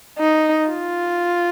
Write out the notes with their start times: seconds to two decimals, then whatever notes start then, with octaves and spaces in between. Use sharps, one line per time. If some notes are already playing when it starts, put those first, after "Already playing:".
0.18 D#4
0.69 F4